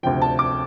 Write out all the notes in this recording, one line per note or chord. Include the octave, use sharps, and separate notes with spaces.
D2 C3 F3 G5
A5
D6